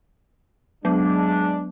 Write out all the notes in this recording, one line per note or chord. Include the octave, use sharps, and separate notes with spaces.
F#3 G#3 B3 D4